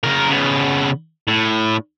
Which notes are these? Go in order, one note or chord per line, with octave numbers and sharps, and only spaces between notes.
C#3 A#4
C#3 B3
A2